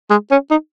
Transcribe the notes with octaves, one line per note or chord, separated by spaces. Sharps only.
G#3
C#4
D#4